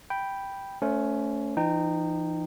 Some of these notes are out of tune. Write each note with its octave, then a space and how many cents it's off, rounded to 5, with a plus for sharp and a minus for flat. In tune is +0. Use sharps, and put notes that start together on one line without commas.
G5 +0 B5 +0
A3 +0 C#4 +20 C5 -10
E3 +40 D#4 -20 G5 +0